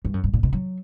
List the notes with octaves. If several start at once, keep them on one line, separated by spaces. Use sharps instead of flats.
G2
F#2
G2
A#2
B2
F#3